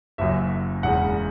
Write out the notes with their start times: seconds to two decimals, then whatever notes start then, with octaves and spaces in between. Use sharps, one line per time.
0.18 F#1 F#2 F#3 E5
0.83 E1 E2 C#3 F#5